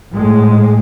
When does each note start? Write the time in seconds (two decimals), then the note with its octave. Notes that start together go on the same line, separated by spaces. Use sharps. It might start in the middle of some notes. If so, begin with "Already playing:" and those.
0.12 A2 G#3